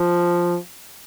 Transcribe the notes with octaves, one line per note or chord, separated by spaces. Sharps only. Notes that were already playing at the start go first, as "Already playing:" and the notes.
Already playing: F3